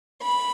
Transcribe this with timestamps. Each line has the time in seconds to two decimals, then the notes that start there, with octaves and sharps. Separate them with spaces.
0.23 B5